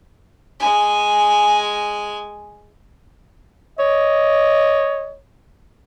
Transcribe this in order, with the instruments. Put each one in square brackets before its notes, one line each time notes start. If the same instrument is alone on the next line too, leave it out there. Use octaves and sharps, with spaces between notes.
[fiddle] G#3 G#5
[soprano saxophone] C#5 [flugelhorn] D#5